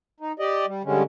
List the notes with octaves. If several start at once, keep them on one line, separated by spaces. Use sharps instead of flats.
D#4
G4 D5 D#5
G3
G2 D3 G3 G#3 C#4